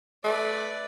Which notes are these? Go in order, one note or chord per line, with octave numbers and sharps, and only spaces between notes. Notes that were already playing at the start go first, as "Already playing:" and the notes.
A3 B4 D5